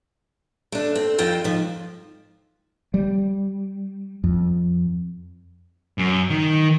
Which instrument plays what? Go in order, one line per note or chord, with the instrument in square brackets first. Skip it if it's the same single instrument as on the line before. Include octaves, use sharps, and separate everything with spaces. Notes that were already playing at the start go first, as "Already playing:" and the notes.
[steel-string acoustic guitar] A3 D4
C4
F2 C4 F4 G5
G#2 F3
[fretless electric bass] G3
F2
[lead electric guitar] F#2
D#3